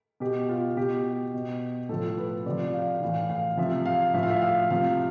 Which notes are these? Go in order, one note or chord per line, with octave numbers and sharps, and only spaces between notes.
B2 G4
F4
B2 G4
B2
A2 F3 A4
B4
C3 F3 D5
F5
A2 E3 F5
F5
C3 F3 E5
F5
A2 F3 E5
F5
E5
F5
C3 F3 F5